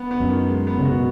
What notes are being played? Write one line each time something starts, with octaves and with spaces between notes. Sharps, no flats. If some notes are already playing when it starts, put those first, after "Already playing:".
Already playing: B3
B3
F#2
D#3
G#3
B3
C#3
F#4
B2